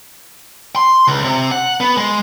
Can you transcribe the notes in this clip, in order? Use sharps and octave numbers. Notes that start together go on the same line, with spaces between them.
C6
C#2
C3
F#5
B3
G#3